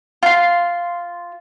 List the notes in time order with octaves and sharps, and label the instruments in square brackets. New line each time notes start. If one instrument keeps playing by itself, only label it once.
[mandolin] F4 C6